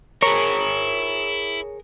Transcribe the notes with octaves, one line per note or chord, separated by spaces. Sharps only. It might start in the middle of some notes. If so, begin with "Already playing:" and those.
E4 G#4 A#4 C#5 E5